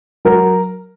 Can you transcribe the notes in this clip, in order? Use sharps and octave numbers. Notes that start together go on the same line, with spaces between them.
F#3 A#4